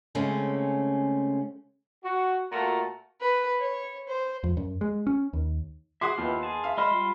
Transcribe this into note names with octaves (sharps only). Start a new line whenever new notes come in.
C#3 G#3 A3 C4 C#4
F#4
A#2 A3 F4 F#4 A4 A#5
B4
C#5
C5
F2
F#2
G#3
C#4
D#2
F#4 G#4 E5 F#5 C6 D6 D#6
D#2 B3 E4 F4 G4
G#4 A5
E5 F5
G#3 C5 D#5 B5 F6
G3 F4 C6